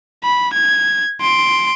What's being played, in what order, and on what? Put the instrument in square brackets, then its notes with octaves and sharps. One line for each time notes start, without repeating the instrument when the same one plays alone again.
[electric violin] B5
G#6
C6 D7